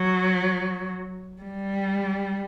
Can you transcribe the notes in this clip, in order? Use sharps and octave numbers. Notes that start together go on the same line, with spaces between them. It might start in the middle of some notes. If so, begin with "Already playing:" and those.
Already playing: F#3
G3